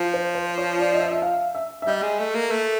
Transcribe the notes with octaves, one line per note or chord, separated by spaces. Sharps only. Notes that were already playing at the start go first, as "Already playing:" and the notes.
Already playing: F3
C5
C5
C#5
D5
D#5
E5
E5
F5
E5
E5
G3 D#5
G#3
A3
A#3
A3